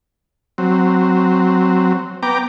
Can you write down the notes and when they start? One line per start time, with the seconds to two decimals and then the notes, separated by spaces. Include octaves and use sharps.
0.58 F#3 C4
2.23 B3 G5 A#5 D6